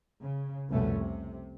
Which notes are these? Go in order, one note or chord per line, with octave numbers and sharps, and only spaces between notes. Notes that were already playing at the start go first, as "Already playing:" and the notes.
C#3
C2 F2 B2 A3 C#4
C3